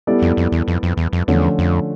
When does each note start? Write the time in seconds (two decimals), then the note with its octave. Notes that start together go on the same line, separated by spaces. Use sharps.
0.07 G3 B3 E4 A4 D5
0.22 F2
0.37 F2
0.52 E2
0.68 F2
0.83 F2
0.97 E2
1.13 F2
1.28 E2 D3 F3 A3 C#4
1.59 F2